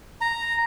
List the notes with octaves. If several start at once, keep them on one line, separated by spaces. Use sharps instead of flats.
A#5